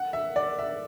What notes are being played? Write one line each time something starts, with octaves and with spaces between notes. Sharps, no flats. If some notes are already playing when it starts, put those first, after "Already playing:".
Already playing: F#5
E5
D5
E5